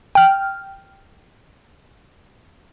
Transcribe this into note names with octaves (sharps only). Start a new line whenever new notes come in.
G5 F6